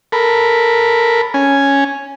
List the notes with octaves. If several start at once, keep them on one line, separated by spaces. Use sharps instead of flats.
A4 A#4 B5
C#4 G#5